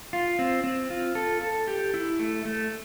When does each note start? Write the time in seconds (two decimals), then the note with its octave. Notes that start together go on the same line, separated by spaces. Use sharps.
0.13 F4
0.39 C4
0.64 C4
0.90 F4
1.15 A4
1.41 A4
1.68 G4
1.94 E4
2.19 A3
2.45 A3